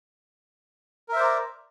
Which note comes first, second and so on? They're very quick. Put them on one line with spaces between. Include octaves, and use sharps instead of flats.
A#4 E5 C5 D5 A#5